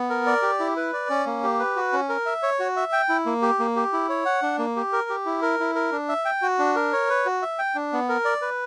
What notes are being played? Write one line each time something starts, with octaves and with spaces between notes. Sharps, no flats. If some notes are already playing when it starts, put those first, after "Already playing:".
Already playing: B3
A#4
D5
G4
E4
B4
D5
C#4
A#3
G4
B4
F#4
C#4
A#4
E5
C#5
F#4
E5
G5
E4
A#3
G4
A#3
G4
E4
C#5
F#5
D4
A#3
G4
A#4
G4
E4
A#4
E4
A#4
D4
E5
G5
F#4
D4
A#4
C#5
B4
F#4
E5
G5
D4
B3
A#4
D5
B4